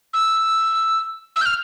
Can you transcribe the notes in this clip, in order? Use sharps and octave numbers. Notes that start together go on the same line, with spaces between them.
E6
E6
G6
F6